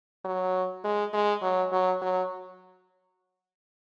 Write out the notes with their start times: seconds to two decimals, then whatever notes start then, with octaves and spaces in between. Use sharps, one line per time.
0.25 F#3
0.84 G#3
1.13 G#3
1.42 F#3
1.72 F#3
2.01 F#3